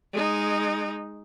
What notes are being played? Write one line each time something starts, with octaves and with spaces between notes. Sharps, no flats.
G#3 D#4